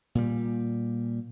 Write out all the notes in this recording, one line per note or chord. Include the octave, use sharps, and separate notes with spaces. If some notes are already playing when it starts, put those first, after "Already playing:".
A#2 G3